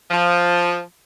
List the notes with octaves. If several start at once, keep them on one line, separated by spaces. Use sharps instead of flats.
F3